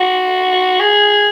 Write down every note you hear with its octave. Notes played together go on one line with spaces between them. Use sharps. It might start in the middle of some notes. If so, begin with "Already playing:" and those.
Already playing: F#4
G#4